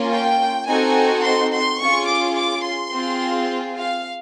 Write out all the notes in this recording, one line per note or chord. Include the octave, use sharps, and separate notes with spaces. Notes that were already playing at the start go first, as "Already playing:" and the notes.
Already playing: A#3 C#4 F4
G5
C4 D#4 F#4 A4 G#5
C6
C6
C#4 F4 G#4 C#6
D6
D6
C6
C4 F4 G#4
F5